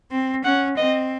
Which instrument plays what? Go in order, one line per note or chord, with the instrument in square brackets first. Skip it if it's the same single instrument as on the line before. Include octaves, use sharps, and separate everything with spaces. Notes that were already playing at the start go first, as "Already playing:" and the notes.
[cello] C4
[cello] C#4 [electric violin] F#5
[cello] C4 [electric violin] D#5